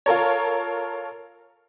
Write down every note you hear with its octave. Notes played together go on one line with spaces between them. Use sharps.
F4 A4 A#4 C#5